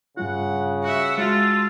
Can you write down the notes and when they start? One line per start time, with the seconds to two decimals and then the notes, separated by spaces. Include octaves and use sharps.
0.17 G2 C#3 G3 F4 F#5
0.83 F#4 E5 F#5
1.18 G#3 F4 F#4 A4